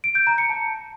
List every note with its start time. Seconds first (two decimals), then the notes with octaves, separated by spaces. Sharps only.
0.04 D7
0.15 G6
0.27 A#5
0.38 C#7
0.50 A5